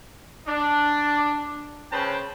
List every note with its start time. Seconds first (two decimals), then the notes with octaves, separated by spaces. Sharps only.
0.47 D4
1.91 C#3 C#4 B4 C5 G5 A5